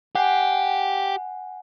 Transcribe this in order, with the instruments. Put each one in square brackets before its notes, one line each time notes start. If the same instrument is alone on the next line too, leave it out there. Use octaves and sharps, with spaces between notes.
[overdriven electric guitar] G4 [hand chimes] F#5 G#5